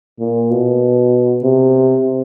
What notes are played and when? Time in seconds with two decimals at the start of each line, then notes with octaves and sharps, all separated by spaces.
0.20 A#2
0.51 B2
1.43 C3